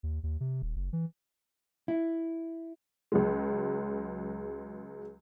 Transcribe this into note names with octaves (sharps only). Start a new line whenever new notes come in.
D#2
D#2
C3
D#1
F#1
E3
E4
C#2 F#3 G#3